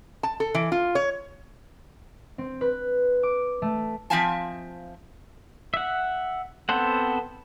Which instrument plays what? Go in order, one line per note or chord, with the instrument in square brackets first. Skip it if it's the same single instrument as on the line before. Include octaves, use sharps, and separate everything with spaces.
[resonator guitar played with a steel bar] A5
A4
E3
F4
C#5
[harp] C4
B4
D6
A3
[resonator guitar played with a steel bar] F3 C4 E5 F5 G#5 A5
[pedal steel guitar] E5 F#5
B3 C4 A4 C5 F#5